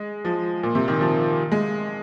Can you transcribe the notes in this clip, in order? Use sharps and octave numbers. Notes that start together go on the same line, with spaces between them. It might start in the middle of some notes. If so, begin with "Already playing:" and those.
Already playing: G#3
F3
A#2
C3
D#3
F3
G#3